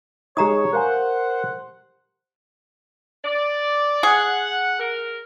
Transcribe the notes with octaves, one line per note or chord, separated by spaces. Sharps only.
G#3 D#4 G4 C#5 A#5 D#6
A#4 C5 F5 F#5 G#5
D5
G#4 F#5
A#4